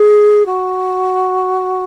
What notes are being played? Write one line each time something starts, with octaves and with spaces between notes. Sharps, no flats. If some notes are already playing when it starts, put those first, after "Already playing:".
Already playing: G#4
F#4